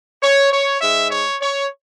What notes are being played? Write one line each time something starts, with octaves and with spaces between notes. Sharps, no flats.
C#5
C#5
G#2 G#3 E5
C#5
C#5